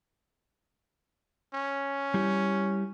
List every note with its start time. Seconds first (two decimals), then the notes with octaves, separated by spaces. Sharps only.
1.54 C#4
2.14 G3 E4 G4